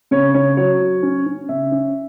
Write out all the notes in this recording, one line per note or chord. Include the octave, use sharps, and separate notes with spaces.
C#3 C#5
C#3 C#5
F#3 C#5
F#3
C#4
C#4
C#3 E5
C#4